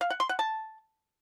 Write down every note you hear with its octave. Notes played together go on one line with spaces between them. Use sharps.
F5
F#5
C6
F#5
A5